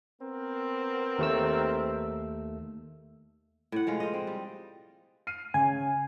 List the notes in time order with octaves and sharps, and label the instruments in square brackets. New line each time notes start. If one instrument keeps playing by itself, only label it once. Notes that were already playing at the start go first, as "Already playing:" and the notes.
[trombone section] B3 C4 A#4
[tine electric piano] D#2 A3 E6
[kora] A2 F#5
F3 G#3 F5
F4 D#5
C4
G3
[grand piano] F6 C7 D#7
[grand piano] C#3 C#5 [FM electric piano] G#5